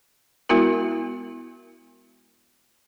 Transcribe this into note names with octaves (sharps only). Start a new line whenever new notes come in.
G#3 B3 E4 F#4 A#4